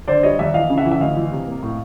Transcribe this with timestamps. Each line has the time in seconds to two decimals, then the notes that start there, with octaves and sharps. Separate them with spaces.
0.08 D3 C5 D5
0.23 G3 C#5 D#5
0.39 D#2 D5 E5
0.54 E3 D#5 F5
0.70 C#3
0.78 E5 F#5
0.85 E3
0.91 E5
1.01 D2 D#5 F5
1.17 E3
1.32 C3
1.47 A#3
1.63 A2